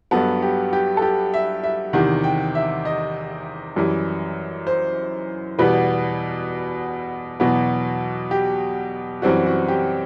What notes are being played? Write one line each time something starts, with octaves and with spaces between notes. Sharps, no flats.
G2 F#3 B3 A4
G4
G4
A4
G4
E5
E5
E2 C3 D#3 F#5
G5
E5
D#5
F#2 E3 G3
C5
E2 B2 G3 B3 B4
E2 B2 F#3 B3
G4
F#2 E3 G3 C4 F#4
F#4
G4